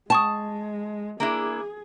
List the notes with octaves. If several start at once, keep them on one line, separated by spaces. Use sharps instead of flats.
G#3 G5 A5 C#6 D#6
A#3 D4 E4 G#4